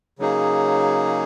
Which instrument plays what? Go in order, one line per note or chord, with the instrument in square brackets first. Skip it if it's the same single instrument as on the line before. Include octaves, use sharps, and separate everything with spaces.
[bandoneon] C#3 F#3 A#3 D#4 G#4